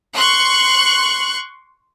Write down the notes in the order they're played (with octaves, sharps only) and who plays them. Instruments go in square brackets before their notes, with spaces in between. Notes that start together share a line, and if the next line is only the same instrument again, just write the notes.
[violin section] C6 C#6 F#6